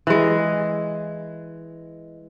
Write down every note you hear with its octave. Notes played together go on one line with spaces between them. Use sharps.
E3 G#3